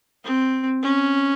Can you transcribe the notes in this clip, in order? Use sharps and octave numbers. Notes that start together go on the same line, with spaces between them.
C4
C#4